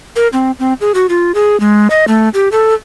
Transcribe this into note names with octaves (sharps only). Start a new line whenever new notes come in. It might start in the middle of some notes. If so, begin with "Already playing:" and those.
A#4
C4
C4
G#4
F#4
F4
G#4
G#3
D#5
A3
G4
A4